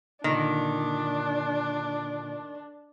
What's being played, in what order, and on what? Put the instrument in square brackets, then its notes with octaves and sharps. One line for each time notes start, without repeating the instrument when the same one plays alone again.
[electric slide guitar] A#2 D3 [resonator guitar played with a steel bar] D#3 [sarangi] D4